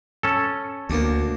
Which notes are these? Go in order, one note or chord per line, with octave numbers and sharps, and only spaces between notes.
C#4 A4
D2 A#3 D4